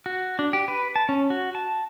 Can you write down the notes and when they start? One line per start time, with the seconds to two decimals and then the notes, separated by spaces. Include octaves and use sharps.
0.06 F#4
0.39 D4
0.53 G4
0.68 B4
0.96 A5
1.09 C#4
1.30 F#4
1.55 A5